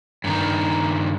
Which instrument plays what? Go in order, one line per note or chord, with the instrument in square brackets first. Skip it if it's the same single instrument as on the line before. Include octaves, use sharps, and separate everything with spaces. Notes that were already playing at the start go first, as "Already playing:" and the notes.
[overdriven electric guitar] G2 D#3